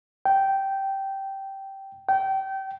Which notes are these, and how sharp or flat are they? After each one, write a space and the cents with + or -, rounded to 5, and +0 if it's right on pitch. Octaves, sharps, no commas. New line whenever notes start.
G5 -10
G5 -25